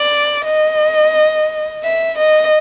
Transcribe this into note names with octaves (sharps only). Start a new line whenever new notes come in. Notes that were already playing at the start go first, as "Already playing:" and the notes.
Already playing: D5
D#5
E5
D#5